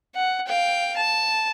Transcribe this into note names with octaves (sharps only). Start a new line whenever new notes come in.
F#5
F5 G5
A5